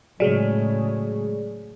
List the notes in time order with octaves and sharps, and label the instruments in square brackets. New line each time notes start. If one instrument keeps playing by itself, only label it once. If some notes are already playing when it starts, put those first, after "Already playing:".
[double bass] A2 C#3 [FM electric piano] F#3 G#3 [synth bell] G#4 D5